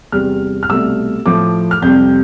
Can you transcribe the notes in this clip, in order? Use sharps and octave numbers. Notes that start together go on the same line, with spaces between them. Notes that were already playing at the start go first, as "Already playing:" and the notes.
E2 C3 G3 F6
F6
C2 B2 A3 E6
A2 F3 A3 D6
F6
F2 C3 G3 G6